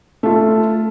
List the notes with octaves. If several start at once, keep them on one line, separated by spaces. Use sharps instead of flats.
A3 F4